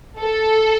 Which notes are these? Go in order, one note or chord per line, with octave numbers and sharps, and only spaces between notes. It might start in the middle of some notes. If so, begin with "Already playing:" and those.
A4